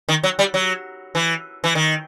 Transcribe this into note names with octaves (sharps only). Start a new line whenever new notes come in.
D#3
F#3
G3
F#3
E3
E3
D#3